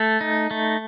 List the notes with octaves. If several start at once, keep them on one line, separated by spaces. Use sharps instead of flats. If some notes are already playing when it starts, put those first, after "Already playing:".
Already playing: A3 A4
D#4
A3